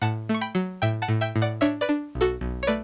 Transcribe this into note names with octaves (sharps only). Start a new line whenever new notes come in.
A2 F#5 A5
A3
C#6
G5 B5
F#3
A2 E5 G5
F#5 A5
A2
E5 G5
A2
D5 F#5
D4 C#5 E5
B4 D5
D4
B1
F#4 A4
B1
C#5
A3 B4 D5